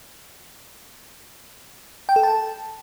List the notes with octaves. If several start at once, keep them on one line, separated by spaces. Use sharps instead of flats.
G5
A4
A5